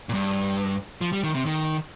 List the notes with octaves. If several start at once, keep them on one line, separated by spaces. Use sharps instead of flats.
A#2
G2
F3
G3
D#3
C3
D#3